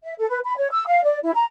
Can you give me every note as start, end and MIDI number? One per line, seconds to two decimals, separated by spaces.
0.03 0.14 76
0.18 0.26 69
0.29 0.39 71
0.44 0.56 83
0.57 0.71 73
0.71 0.86 88
0.87 1.03 77
1.04 1.18 74
1.23 1.31 64
1.34 1.44 82